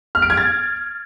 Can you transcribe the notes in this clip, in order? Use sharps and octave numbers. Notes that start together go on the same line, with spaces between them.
F6
D7
G#6
A6